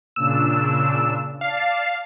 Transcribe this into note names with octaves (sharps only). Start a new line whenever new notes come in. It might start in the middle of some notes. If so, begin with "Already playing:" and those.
A#2 C#3 D4 E6
D5 F5 A5 C7